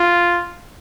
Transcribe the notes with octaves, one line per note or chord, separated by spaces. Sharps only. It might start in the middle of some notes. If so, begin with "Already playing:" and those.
Already playing: F4